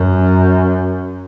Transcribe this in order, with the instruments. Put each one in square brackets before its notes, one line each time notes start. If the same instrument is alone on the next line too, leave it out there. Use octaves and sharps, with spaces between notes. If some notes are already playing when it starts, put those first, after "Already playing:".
Already playing: [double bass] F#2